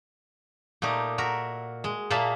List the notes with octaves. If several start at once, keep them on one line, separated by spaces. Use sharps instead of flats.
A#2 A3 D#4 G4
F#4 A#4 E5
G#3
A#2 A#3 G#4 E5 A5